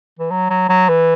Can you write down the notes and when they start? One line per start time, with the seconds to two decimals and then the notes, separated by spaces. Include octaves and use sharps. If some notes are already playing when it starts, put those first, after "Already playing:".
0.19 E3
0.31 F#3
0.50 F#3
0.69 F#3
0.89 E3